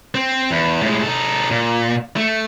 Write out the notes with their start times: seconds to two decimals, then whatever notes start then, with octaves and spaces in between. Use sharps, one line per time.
0.15 C4
0.51 E2
0.82 A2 G#3
1.03 D#4 A4
1.51 A#2
2.16 A3